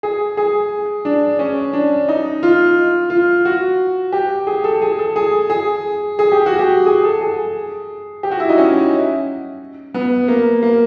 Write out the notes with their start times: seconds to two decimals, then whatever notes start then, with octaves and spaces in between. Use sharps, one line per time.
0.03 G#4
0.37 G#4
1.05 D4
1.39 C#4
1.73 D4
2.08 D#4
2.43 F4
3.10 F4
3.45 F#4
4.12 G4
4.47 G#4
4.64 A4
4.82 G#4
4.99 A4
5.16 G#4
5.50 G#4
6.19 G#4
6.32 G4
6.46 F#4
6.59 G4
6.86 G#4
7.04 A4
7.21 G#4
8.23 G4
8.31 F#4
8.40 E4
8.49 D#4
8.58 C#4
9.94 B3
10.28 A#3
10.63 A#3